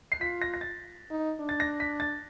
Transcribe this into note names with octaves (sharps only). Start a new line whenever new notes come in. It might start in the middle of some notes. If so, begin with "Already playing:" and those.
C7
F4 B6
A#6
A#6
A6
D#4
D4
A6
A#6
B6
A6